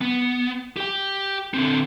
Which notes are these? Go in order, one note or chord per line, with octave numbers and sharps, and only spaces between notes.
B3
G4 G5
D3 C4